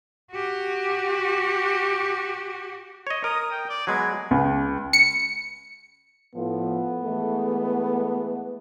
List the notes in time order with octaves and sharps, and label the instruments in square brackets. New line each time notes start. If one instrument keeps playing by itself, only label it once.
[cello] F#4 G4
[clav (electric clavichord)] C#5 D#5
[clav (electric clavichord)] A#4 [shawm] D#6
[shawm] G5
D5
[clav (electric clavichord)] F#3 G#3 B3 [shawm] G#5
[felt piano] C#2
[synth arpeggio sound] C#7
[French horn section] A2 F3 [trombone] B3
[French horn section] E3 G#3 A3